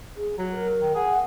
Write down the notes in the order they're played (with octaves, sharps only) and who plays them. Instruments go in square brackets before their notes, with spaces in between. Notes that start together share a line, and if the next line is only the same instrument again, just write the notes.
[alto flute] G#4
[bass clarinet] F#3 [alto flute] F#4
[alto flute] A#4
[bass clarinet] D#3
[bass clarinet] G#4 [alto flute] F#5